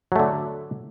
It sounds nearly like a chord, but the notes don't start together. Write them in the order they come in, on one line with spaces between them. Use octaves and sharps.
F#3 A3 D3